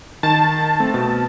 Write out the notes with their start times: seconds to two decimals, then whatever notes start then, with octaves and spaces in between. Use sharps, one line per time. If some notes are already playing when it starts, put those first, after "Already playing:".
0.23 D#3 A5
0.80 A3 C4
0.94 B2